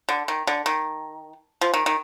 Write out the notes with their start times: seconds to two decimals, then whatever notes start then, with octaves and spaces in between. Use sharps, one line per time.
0.09 D3
0.28 D#3
0.47 D3
0.66 D#3
1.61 F3
1.74 D#3
1.86 D#3